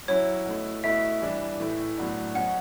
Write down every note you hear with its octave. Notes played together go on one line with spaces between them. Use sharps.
F#3 C#4 E4 C#5
B2 A3 E4
B2 A3 E4 E5
E3 G3 D4
A2 E3 A3 E4
A2 F#3 B3 D4
B2 F#3 C#4 F#5